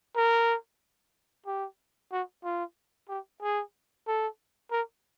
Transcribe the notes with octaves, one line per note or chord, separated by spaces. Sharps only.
A#4
G4
F#4
F4
G4
G#4
A4
A#4